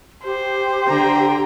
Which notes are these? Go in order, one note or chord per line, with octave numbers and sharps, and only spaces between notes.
G4 C5
D3 G5 A#5